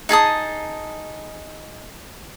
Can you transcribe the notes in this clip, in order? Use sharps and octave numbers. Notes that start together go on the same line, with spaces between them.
D#4 G#4 A5 D#6